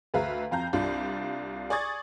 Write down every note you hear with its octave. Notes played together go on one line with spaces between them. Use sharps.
D2 B4 E5 F5 A#5
F2 F5 A#5 G6
C2 D4 F4
D5 G#5 C#6 D#6 G#6 A6